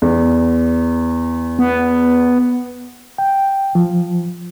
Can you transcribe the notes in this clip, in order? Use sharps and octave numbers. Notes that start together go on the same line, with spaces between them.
E2
B3
G5
F3